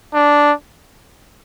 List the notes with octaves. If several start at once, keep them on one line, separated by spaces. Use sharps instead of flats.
D4